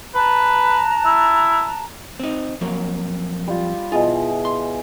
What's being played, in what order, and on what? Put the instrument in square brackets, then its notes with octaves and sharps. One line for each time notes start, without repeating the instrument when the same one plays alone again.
[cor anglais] B4 [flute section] A5 A#5 F#6
[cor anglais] E4
[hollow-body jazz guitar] C4 D#4
F2 F#3 A#3
[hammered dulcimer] G3 F4
[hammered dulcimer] B2 E3 G#4 [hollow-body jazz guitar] F4
[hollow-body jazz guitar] C6